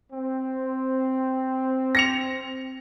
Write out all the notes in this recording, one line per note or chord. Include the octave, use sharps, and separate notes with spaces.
C4
A#6 C#7 F7